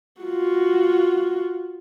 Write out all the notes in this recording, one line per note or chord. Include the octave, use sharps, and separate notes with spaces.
F4 F#4